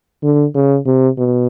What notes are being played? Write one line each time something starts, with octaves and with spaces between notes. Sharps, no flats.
D3
C#3
C3
B2